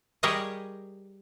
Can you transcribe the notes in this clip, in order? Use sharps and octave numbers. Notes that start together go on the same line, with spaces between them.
G3 G4 G#4 A#4 C#5 D#5